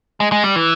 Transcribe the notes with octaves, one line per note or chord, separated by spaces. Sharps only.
G#3
G#3
G3
E3